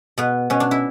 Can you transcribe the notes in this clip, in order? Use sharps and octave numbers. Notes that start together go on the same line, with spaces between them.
B2 B3
B2 C#4
D4
E4